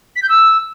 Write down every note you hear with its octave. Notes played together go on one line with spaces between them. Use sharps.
B6
G6
E6